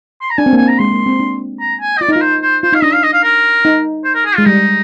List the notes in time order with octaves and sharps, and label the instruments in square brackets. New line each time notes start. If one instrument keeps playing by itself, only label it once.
[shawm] C6
A#5
[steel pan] D4 [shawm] G#5
[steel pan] C4
A#3
[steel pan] C4 [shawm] G#5
[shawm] A#5
[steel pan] G#3 [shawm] C6
[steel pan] A#3
C4
D4
[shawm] A#5
G#5
D#5
[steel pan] F4 [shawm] D5
[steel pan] D#4
[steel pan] F4 [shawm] A#4
[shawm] C5
C5
[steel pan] F4 [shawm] C5
[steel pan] D#4 [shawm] F5
[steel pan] D4 [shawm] D#5
[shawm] F5
D#5
F5
A#4
[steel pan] D#4
[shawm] C5
A#4
G#4
F4
[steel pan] G#3
[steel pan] G3 [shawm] D#4